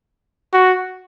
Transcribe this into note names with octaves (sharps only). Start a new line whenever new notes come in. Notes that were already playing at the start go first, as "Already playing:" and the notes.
F#4